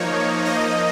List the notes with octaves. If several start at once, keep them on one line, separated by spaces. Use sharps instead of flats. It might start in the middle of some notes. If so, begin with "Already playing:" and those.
Already playing: F3 A#3 D#4 C#5
F3 A#3 D#4 D#5